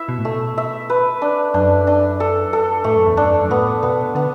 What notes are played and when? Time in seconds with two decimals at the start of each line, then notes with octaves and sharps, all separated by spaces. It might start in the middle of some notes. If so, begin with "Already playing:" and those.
Already playing: E4 E5
0.09 B2
0.18 A2
0.24 B2 A3
0.58 E5
0.90 B4
1.22 D4
1.54 F#2 D4
1.87 D4
2.20 A4
2.53 A4
2.84 A2 A3
2.96 F#2
3.06 E2
3.17 F#2 D4
3.41 F#2
3.50 A2 B3
3.83 B2 B3
4.15 D3 B3